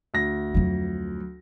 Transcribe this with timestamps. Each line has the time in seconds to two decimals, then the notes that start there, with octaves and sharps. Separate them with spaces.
0.14 D2 A#6
0.54 F2 F#3